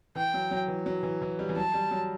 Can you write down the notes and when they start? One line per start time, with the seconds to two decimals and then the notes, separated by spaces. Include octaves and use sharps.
0.15 E3 G5
0.34 F#3
0.51 F#3
0.68 E3
0.86 F#3
1.03 E3
1.22 E3
1.39 G3
1.49 E3
1.56 F#3 A5
1.74 G3
1.91 F#3